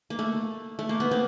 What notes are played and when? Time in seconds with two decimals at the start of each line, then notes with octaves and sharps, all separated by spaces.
0.10 A#3
0.19 A3
0.79 A3
0.89 A#3
1.00 B3
1.11 A#3 C4